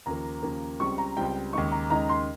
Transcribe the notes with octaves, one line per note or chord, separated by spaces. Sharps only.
D#2 C#3 F3 A#3 A#5
D#2 C#3 F3 A#3
C#2 C#3 G3 C4 C#6
A#5
C#2 C#3 G3 C4 G5
D#2 C#3 G#3 D#4 C#6
A#5
D#2 C#3 G#3 D#4 A#5
C6